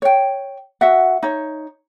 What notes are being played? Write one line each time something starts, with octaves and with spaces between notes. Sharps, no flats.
C#5 G5
F#4 E5 F#5
D#4 C#5